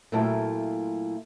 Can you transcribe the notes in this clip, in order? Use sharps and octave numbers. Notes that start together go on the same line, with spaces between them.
A#2 F#3 A3 E4 F4 G5